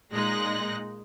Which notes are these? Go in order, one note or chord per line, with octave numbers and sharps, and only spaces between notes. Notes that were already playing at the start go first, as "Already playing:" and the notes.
A#2 G#3 D#4 F#6 A#6